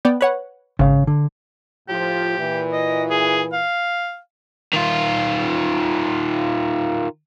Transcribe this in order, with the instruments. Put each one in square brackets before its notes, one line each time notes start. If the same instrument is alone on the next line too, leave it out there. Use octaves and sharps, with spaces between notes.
[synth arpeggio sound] B3 D5 G5
B4 C#5 F#5
[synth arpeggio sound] G#1 [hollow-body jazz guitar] C#3 F5
[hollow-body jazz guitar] D3
[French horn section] A2 F3 F4 [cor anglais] G4
[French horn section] A#2 E3
[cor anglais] D#5
G#4
F5
[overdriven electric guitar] D#3 F4